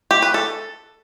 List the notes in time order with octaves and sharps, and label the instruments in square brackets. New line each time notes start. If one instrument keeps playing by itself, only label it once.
[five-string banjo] G4
B4
A4